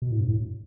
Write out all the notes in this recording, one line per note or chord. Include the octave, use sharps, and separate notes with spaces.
B2
A2
G2
A2